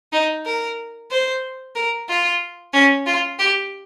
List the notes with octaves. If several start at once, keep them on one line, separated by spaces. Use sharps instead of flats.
D#4
A#4
C5
A#4
F4
C#4
F4
G4